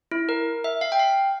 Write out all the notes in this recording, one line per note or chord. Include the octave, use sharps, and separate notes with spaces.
E4
A#4
E5
F5
G5
F5